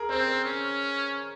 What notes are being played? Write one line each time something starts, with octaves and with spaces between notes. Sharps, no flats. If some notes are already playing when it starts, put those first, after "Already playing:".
Already playing: G#4 A#4
C4 C5
A#4
C#4